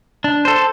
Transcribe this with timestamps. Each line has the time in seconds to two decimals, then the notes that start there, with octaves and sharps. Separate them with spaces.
0.24 D4
0.45 A4 C5